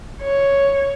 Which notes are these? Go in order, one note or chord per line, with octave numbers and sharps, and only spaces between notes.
C#5